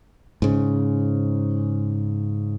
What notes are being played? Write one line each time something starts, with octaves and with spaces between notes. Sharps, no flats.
G#2 C#3